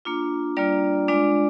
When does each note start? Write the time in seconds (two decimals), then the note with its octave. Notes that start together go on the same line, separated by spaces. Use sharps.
0.05 A#3 D4 F4
0.57 G3 A#3 D4 F4 D5
1.08 G#3 D4 F4 D5